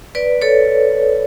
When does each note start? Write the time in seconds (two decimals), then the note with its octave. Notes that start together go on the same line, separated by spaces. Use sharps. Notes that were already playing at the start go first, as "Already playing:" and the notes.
0.15 B4 D5
0.42 A4 C#5